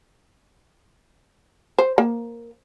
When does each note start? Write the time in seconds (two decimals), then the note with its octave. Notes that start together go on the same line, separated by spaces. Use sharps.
1.78 C5
1.98 A#3